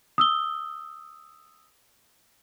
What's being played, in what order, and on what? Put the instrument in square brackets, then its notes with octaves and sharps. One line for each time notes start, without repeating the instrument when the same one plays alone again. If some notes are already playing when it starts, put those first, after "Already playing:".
[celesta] D#6 E6 G7